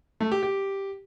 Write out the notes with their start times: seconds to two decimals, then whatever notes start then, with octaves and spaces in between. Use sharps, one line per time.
0.20 A3
0.32 G4
0.43 G4